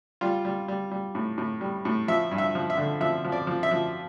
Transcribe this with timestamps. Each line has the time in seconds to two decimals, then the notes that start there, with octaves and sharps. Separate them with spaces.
0.21 G3 F4
0.45 G3
0.68 G3
0.91 G3
1.15 A2
1.38 A2
1.61 G3
1.85 A2
2.08 F3 E5
2.31 G2
2.38 E5
2.55 F3
2.70 E5
2.77 D3
3.01 F3 E5
3.25 F3
3.32 D5
3.47 F3
3.63 E5
3.71 F3